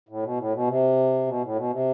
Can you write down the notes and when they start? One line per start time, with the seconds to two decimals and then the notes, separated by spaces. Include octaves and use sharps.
0.09 A2
0.23 B2
0.38 A2
0.53 B2
0.68 C3
1.27 B2
1.42 A2
1.56 B2
1.71 C3